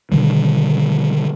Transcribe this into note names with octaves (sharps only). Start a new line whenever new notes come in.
B2 D3 D#3 G3